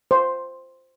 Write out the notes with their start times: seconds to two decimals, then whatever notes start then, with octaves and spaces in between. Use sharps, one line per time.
0.11 C5